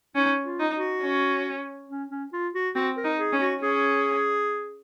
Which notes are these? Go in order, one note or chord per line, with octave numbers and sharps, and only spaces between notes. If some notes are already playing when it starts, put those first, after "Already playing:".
C#4 D#4
F4
D#4
F#4
C#4
C#4
C#4
F4
F#4
C4 F#4
A#4
D#4
G#4
C#4
F#4
C#4 G#4